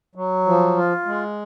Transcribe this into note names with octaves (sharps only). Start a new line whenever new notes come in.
F#3
F3
F4
G#3